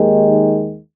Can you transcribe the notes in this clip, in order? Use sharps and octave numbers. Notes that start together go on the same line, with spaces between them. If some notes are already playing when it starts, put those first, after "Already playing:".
Already playing: D#2 D#3 G#3